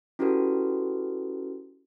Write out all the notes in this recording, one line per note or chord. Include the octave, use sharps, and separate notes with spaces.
C#4 E4 F#4 G4 A4 B4